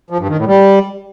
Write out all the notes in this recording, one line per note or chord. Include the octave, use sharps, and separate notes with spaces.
F3
G2
D#3
A2
G3